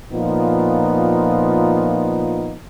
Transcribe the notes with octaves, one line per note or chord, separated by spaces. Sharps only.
A#2 F3 B3 D#4 F4